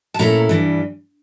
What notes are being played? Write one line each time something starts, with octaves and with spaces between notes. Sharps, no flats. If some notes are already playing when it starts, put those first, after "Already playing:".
A5
A#2 A3 C#4 E4 A#5
G2 E3 G3